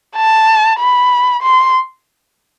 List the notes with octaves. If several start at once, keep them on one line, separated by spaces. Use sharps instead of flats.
A5
B5
C6